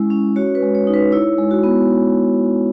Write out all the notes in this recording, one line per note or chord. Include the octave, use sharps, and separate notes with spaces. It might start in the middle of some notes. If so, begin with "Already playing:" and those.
Already playing: G#3 C#4 E4
C#4
F#4 C#5
B4
G#3
C#5
D#4
B4
E4 C#5
G#3
F#4
B3